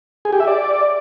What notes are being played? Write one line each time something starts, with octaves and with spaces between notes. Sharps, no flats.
G#4
G4
E5
D5